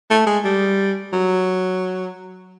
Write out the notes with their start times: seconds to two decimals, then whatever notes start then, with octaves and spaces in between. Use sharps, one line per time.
0.10 A3
0.27 G#3
0.45 G3
1.13 F#3